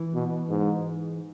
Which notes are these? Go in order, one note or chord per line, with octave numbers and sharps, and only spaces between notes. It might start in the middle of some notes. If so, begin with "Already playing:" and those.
Already playing: E3
B2
G#2